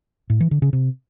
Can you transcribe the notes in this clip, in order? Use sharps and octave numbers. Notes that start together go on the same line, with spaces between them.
A2
E3
D3
C#3
C3